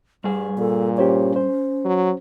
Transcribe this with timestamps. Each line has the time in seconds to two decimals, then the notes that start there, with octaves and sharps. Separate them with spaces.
0.24 G2 G3 G#4
0.58 A#2 A4
0.98 C#4 G4 C5 C#5
1.36 C5
1.85 F#3